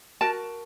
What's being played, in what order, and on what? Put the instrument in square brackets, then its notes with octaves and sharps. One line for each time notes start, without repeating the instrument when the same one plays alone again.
[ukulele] F#4 A#4 A5